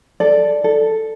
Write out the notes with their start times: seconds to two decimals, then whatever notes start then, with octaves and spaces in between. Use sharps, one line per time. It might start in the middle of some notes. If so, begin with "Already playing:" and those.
0.20 A4 D5
0.64 A4